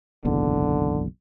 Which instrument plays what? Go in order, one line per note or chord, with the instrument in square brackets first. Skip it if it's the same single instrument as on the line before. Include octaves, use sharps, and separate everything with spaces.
[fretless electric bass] F#1 B1 E2 [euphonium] D3